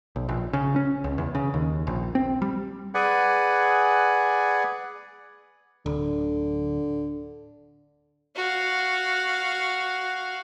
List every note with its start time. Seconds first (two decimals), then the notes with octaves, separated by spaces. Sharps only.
0.16 B1
0.29 A#1
0.53 C#3
0.76 C#4
1.04 C#2
1.18 E2
1.35 C#3
1.54 D#2
1.87 A#1
2.15 C4
2.42 G3
2.94 G#4 B4 D5 F#5 G#5
5.86 D1 D3
8.36 F#4 F5